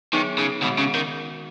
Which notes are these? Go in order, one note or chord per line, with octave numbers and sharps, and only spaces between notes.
D#3 F#3 B3 D#4 G#4 C#5
C#3
B2 D#3 G#3 B3 F#4
C#3
D#3